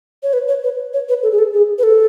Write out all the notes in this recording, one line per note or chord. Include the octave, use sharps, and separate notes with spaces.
C#5
B4
C#5
B4
C#5
B4
A4
G#4
A4
G#4
B4
A4